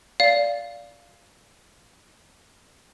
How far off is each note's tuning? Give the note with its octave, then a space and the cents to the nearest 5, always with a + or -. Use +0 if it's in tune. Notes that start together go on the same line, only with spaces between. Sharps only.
D5 -15 F5 +0